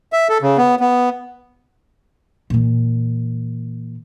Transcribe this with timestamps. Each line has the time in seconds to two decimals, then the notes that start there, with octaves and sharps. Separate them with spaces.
0.13 E5
0.29 A4
0.42 C#3
0.57 B3
0.80 B3
2.50 A#2 E3